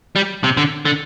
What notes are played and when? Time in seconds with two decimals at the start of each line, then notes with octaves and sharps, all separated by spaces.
0.16 G3
0.44 C3
0.57 D3
0.85 D3